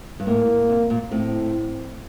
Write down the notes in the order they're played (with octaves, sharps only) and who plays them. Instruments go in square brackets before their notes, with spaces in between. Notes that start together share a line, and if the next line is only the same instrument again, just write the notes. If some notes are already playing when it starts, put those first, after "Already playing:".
[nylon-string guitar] G2
[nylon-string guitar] A2 [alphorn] A#3
[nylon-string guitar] C3
A#2
[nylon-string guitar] A2 [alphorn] C4